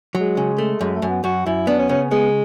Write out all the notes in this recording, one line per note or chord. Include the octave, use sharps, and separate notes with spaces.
F#3
G#3
C#3
A3
F#2 G#3
A3
F#2
B3
F#2 F#4
F#2 E4
B3 D4
C#4
C#3 C#4
G#3 B3